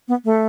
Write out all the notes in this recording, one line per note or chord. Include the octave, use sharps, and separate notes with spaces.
B3
A3